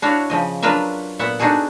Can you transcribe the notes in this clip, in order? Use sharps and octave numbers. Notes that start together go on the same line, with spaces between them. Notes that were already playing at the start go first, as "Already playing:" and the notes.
D4 E4 F#4 C#5 F5
C#3 F3 D#5
F#3 D4 F4 A#4 B4 E5
A#2 B3 E5 F#5
D4 D#4 F#4 G#4 A4